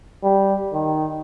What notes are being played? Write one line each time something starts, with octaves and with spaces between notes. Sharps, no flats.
G3
D#3